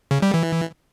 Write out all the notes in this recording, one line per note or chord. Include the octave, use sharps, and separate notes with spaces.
C#3
G3
E3